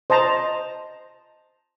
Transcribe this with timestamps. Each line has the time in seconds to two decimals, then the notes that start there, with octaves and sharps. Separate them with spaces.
0.10 C5 D#5 A5 A#5